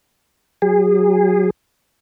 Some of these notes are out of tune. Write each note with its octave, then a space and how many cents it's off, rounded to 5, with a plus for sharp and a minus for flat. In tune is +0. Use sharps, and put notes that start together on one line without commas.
F#3 +0 G#4 -30